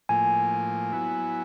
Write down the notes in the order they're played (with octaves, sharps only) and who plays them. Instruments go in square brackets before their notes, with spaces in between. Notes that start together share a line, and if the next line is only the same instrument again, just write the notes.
[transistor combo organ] A2 F3 A#3 [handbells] G#5
[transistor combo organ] F#3 B3 E4